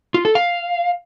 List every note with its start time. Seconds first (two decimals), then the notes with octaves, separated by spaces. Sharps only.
0.14 F4
0.25 A4
0.35 F5